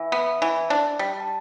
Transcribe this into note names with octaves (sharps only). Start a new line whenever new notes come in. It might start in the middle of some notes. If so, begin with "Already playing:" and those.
Already playing: E3 E5
B3
E3
D4
G3
A5